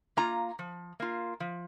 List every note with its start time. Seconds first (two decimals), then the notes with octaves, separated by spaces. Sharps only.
0.17 A#3 F4 A#5
0.59 F3
1.00 A#3 F4
1.40 F3